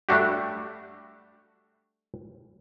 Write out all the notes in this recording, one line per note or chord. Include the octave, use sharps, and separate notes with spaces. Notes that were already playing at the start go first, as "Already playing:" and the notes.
G3 A3 D4 F#4 G4